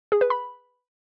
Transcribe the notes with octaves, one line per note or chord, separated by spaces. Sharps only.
G#4
B4
B5